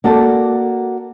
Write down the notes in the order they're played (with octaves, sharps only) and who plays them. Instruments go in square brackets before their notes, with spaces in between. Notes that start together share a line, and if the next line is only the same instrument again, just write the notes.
[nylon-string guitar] A#3 F#4 A4 D5 A5